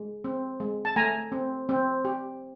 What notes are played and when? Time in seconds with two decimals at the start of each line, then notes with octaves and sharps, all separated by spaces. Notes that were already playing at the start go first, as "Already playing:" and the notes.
Already playing: G#3
0.24 C4
0.60 G#3
0.85 A5
0.96 A3 G#5 A#5
1.32 C4
1.69 C4
2.05 G4